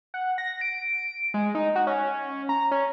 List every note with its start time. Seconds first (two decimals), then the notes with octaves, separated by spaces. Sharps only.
0.14 F#5
0.38 A#6
0.61 D7
1.34 G#3
1.55 D#4
1.75 F#4
1.87 C#4
2.49 A#5
2.71 C#4